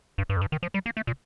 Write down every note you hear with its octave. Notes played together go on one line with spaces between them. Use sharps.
G2
G2
F2
G2
D#3
F3
G3
A#3
A3
A#2